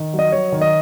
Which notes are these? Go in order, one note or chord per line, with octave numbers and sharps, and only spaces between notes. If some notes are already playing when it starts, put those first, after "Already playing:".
Already playing: D#3
F#3
D#5
F#3 C#5
D#3
D#5